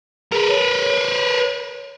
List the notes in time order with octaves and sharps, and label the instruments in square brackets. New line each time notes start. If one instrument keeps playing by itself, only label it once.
[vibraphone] G#4 [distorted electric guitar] A#4 B4
[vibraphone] C#5